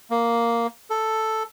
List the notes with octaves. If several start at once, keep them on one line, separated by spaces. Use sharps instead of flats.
A#3
A4